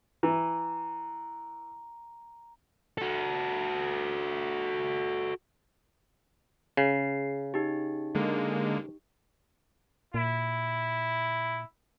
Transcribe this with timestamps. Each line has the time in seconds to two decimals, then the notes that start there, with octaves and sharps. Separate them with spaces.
0.23 E3 A#5
2.98 F#4 A4
6.77 C#3 C7
7.54 D#4 G4
8.15 D3 G#3 A#3
10.14 A#2 E4